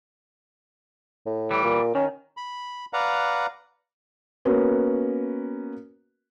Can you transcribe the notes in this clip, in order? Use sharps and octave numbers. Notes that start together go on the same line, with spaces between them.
A2
E3 G3
A#2
D#3 C#4
B5
B4 D5 F5 F#5 A#5
A#3 B3 C#4 F#4 A#4 B4